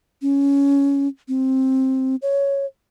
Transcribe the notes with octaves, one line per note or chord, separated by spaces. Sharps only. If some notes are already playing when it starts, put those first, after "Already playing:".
C#4
C4
C#5